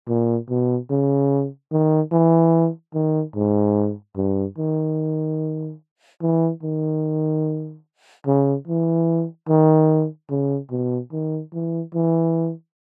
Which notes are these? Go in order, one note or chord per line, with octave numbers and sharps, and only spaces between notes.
A#2
B2
C#3
D#3
E3
D#3
G#2
G2
D#3
E3
D#3
C#3
E3
D#3
C#3
B2
D#3
E3
E3